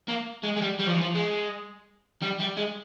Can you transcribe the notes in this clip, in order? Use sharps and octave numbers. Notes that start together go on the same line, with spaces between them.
A#3
G#3
G#3
G3
G3
F3
E3
F3
G#3
G3
G3
G#3